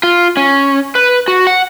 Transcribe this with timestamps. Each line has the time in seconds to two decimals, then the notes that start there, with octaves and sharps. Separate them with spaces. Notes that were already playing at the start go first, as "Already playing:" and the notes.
0.03 F4
0.37 C#4
0.95 B4
1.28 F#4
1.47 F#5